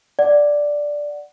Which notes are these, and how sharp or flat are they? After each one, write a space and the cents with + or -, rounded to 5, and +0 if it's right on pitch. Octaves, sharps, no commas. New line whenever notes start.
D5 +0 F#5 +0